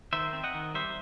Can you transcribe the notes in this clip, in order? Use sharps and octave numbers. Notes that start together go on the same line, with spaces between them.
D#3 C5 E5
C4
D#5 F#5
D#3
G3 C5 E5